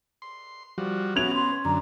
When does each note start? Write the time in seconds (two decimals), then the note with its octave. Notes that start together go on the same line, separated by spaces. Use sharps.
0.22 C6
0.78 F3 G3 F#4
1.16 B3 C#4 F#4 G#6 F7
1.34 C6
1.65 F#2 D3 A#5